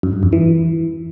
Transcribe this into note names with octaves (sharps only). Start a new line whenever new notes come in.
F#2
G2
F2
E3